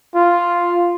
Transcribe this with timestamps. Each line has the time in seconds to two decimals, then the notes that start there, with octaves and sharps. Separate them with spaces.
0.15 F4